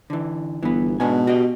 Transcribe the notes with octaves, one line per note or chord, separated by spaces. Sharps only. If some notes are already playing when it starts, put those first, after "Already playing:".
D3 E3
G1 E3 B3
G#2 B2 D4 G#5
F#4 G4 D#5